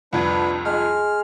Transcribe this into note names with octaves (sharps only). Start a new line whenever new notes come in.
C2 F2 D4 B4 G#6
G#3 G#4 F6